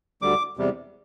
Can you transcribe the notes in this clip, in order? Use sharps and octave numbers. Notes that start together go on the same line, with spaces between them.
D2 D3 G3 D6
E2 C3 G3